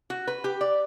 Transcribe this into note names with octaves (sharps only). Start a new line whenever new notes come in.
F#4
B4
G4
D5